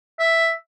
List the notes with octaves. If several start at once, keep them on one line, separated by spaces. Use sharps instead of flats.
E5